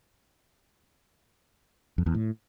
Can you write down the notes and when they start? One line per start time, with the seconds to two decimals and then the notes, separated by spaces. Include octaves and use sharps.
1.98 F2
2.06 E2
2.14 A2